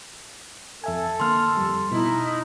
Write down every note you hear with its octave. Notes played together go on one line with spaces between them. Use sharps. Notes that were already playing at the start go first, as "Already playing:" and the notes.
F2 A4 E5 G#5
D3 A#3 C6 F6
F2 G3
B2 D#4 E4